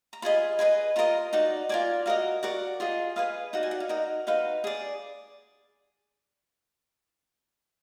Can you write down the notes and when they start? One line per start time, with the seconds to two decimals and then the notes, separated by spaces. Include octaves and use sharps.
0.13 A#5
0.22 F4 G#4 D#5 B5
0.59 G#4 B4 D#5 B5
0.96 F4 A#4 D#5 A#5
1.33 D#4 F#4 D5
1.69 F4 A#4 D5 G#5
2.06 F#4 A#4 D#5 F5
2.43 F#4 A#4 D5 F#5
2.80 F4 G#4 D#5
3.16 G#4 B4 D#5 F5
3.53 D#4 F#4 D5 F#5
3.63 G#5
3.71 F#5
3.80 F5
3.89 D#4 F#4 A#4 D#5
4.27 D#4 F#4 B4 F5
4.64 G#4 D5